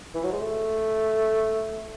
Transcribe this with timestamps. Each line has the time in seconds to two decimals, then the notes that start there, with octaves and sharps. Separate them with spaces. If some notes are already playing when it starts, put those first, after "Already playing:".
0.14 E3
0.24 F#3
0.33 G#3
0.41 A3